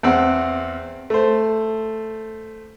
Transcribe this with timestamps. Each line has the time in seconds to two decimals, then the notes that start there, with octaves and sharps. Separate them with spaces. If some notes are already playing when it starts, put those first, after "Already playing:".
0.03 E2 C4 F#5
1.10 A3 C5